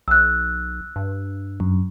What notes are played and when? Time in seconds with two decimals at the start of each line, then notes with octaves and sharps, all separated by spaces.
0.08 B1 E6 F#6
0.96 G2
1.60 F#2